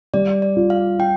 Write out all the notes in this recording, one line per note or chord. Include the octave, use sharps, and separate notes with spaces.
G3 D5
D5
F4
F5
F4 G5